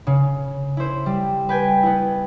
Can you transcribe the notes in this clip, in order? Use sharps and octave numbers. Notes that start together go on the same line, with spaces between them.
C#3
E4 C5
G3
B4 G5 G#5
B3 E4